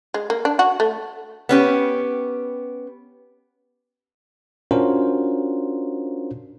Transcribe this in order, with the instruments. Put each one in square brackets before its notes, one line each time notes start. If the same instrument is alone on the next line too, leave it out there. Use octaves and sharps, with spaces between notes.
[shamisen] G#3
A#3
D4
F#4
A3
[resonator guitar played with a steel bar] B3 C#4 G4
[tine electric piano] C#4 D4 F4 F#4 A#4 C5